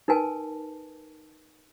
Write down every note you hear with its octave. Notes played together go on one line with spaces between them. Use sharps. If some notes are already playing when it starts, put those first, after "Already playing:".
D#4 A#4 B4 G#5 A5